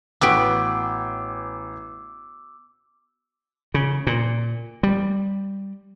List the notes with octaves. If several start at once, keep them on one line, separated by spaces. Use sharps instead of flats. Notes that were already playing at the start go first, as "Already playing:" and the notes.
A1 B3 F#4 B4 G5 D6 E6 D7
C#3
A#2
G3